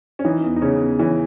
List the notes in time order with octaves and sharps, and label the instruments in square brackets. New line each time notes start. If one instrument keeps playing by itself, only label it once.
[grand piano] C#4
E3 D#4
E2
D#4
C#3 C#4
E2
E3 C#4